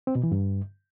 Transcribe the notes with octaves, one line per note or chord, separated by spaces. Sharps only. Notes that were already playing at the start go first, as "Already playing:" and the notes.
C4
B2
E3
G2